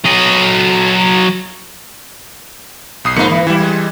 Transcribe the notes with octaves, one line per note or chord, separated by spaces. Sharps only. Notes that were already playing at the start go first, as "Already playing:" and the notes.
F#3 D#5
B1 D#6 C7
G#2 F3 A#3 B3 D#4 C#7
E3
E3 G3 E4
G#3